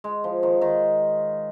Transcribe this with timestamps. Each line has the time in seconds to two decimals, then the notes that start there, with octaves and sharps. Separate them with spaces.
0.04 G#3
0.24 F3
0.43 D#3
0.61 D#3